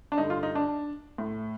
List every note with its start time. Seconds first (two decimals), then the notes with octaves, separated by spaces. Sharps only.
0.12 D4
0.18 G2 D3 D#4
0.30 F4
0.43 D#4
0.55 D4
1.18 A2